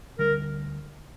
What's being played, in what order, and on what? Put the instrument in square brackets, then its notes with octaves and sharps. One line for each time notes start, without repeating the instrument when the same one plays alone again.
[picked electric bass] D2 D3 G3 [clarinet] A#4